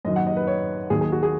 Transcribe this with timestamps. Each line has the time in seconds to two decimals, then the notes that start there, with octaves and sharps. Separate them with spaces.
0.05 F#2 D#5
0.07 D#3 F#3
0.16 F#5
0.27 D#5
0.37 B4
0.47 C#5
0.90 D#2 D#3 F#3 G#4
1.01 G#4
1.12 F#4
1.23 G#4